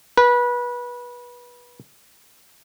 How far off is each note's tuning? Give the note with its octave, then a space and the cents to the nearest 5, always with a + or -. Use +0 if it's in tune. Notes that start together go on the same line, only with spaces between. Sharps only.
B4 -25